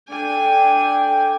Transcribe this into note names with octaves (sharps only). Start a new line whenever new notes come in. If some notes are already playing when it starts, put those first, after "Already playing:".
D4 A4 G5 G#5